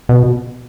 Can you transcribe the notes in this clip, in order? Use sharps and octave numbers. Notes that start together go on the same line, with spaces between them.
B2